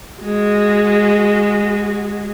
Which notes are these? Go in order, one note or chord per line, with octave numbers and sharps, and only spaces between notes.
G#3 F#4